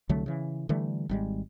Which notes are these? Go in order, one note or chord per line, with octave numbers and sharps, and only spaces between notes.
C2 D3 F#3 A3
C#3 E3
D3 E3 G3 A3
G#1 G3 G#3